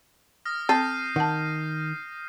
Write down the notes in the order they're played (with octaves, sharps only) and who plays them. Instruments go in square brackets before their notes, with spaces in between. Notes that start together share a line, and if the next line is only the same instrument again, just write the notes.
[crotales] D#6 F6 A#6
[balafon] C4 [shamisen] A4 [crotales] G6 C7 D#7
[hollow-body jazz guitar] D#3 [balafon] F#5 A5